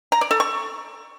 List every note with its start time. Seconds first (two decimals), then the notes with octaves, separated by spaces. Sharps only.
0.12 A#5
0.21 D5
0.31 A4
0.40 C#6